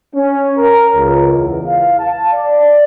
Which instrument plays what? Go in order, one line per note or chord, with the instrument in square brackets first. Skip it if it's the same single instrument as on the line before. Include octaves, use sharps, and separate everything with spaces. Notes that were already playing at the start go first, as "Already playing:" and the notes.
[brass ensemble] C#4
A#4
C#2
E2
F5
A5
D5